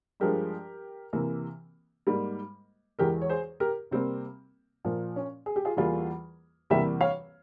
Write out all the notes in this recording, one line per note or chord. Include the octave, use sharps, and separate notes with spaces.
G2 F3 G#3 G4 A#4
C3 E3 A#3
G#2 G3 A#3
E2 E3 G#3 G4 A#4
C#5
G#4 C5
G4 A#4
C3 G3 A#3 C4
A#2 F3 A#3
C#4
G#4
G4
F4 G#4
E2 E3 G3 A#3 F4 G#4
E2 C3 E3 G3 A#3 E5 G5
C#5 F5